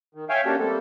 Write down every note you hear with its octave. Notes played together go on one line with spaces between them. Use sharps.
D#3
C#5 E5 F5 G5 G#5
A#3 C#4 D4 F#4 G4 A4
G3 A3 A#3 C4 A4